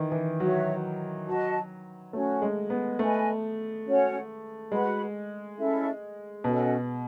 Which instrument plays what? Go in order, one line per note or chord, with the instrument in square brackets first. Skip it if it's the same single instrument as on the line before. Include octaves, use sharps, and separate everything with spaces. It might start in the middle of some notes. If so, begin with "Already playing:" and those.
Already playing: [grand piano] D#3 E3
E3
[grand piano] F#3 [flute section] F#4 C#5 E5
[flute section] F#4 B4 D#5 A5
[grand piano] A3 [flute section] C#4 F#4 C#5
[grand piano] G#3
B3
[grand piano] A3 [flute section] B4 D#5 G#5 B5
[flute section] C#4 F#4 C#5 F#5
[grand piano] G#3 [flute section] F#4 B4 F#5 B5
[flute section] C#4 E4 A4 E5
[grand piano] B2 [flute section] C#4 F#4 A4 D#5